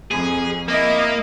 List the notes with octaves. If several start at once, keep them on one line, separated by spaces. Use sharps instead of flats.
F2 G#4
A#3 E4 D#5